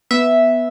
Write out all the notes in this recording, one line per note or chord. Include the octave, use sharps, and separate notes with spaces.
B3 E5